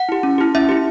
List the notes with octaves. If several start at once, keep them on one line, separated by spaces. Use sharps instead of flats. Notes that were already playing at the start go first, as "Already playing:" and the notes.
Already playing: F#5
E4 G4
C#4
E4 G4
C#4 E5
E4 G4